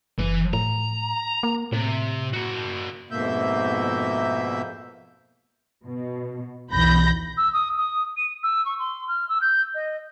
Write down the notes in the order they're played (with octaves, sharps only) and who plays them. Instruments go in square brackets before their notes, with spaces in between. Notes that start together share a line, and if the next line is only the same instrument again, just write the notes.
[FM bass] F#1 [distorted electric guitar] E3 B4
[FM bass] A2 [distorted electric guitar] A#5
[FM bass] A#3
[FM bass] A2 [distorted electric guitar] C3
[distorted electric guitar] A#3 F#4
[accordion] F2 G#2 B2 A#3 E5 G6
[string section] B2
B1 E2 B5 G6 A#6
[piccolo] E6
D#6
D#6
D#7
E6
C#6
C6
F6
E6
G6
D#5